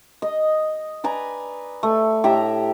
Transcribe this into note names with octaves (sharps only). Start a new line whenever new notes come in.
D#5
B4 D5 G#5 A#5
A3
A2 G4 E5 A#5